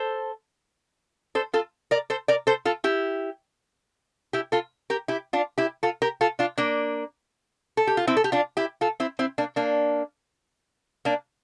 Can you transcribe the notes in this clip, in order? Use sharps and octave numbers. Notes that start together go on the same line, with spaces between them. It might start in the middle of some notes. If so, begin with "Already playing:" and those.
Already playing: A4 C5
A4 C5
F4 A4
A#4 D5
A4 C5
A#4 D5
A4 C5
F4 A4
E4 G4
E4 G4
F4 A4
G4 A#4
E4 G4
D4 F4
E4 G4
F4 A4
G4 A#4
F4 A4
D4 F4
A#3 D4
A4
G4
F4
C4 E4
A4
G4
D4 F4
E4 G4
F4 A4
C4 E4
C4 E4
A#3 D4
A#3 D4
A#3 D4